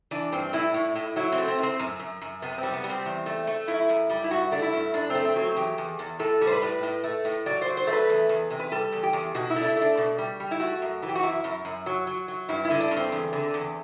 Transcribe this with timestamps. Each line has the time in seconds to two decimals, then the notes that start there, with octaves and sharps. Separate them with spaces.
0.11 E3 D4
0.32 G2 C4
0.53 A2 E4
0.74 A2
0.95 A2
1.16 F#3 E4
1.32 C4
1.38 A3
1.48 C4
1.58 A2 C4
1.79 F#2
2.00 F#2
2.22 F#2
2.42 C3 B3
2.58 C4
2.63 G3
2.73 B3
2.84 G3
2.89 C4
3.05 E2
3.26 A3
3.47 A3
3.68 F#2 E4
3.89 F#2
4.10 G3
4.24 E4
4.31 G2 F#4
4.52 A3 D4
4.62 E4
4.73 G2
4.94 F#2 D4
5.10 C4
5.15 A3
5.25 C4
5.36 F#3
5.41 C4
5.56 E2 G4
5.78 E2
5.99 E2
6.19 A2 A4
6.41 G3
6.47 C5
6.52 B4
6.62 A2
6.83 A2
7.04 A3
7.25 A2
7.46 F#3 D5
7.62 F#3 C5
7.77 C5
7.87 A3
7.93 B4
8.09 E2
8.29 E2
8.51 C3
8.59 B4
8.72 G3 A4
8.92 E2
9.03 G4
9.13 E2
9.35 B2 F#4
9.50 E4
9.56 A3
9.61 D4
9.66 E4
9.76 A3 D4
9.97 B2
10.18 G3
10.40 G3
10.51 E4
10.60 A3 F#4
10.82 F#2
11.02 E3
11.08 G4
11.15 F#4
11.23 F#2 E4
11.44 F#2
11.65 F#2
11.86 F#3
12.07 F#3
12.28 F#3
12.49 G2 E4
12.65 E4
12.70 D3
12.80 D4
12.91 G2
12.97 C4
13.12 E2
13.33 D3
13.54 E2